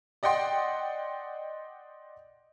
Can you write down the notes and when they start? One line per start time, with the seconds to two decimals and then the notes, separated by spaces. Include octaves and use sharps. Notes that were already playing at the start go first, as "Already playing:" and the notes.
0.23 D5 D#5 F#5 G5 C6